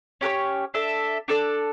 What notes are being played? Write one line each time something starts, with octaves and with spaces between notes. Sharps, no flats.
C#4 G4 A#4 C#5
D4 A4 E5
D4 A4 D5